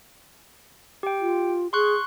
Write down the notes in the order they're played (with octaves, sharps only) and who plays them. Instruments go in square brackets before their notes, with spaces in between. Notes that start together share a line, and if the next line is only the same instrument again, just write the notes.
[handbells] G4 G5
[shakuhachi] F4
[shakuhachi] G#4 [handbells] C6 C#6 F#6